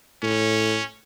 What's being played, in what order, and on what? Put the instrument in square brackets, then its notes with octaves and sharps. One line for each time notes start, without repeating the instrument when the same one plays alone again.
[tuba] A2 [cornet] C#4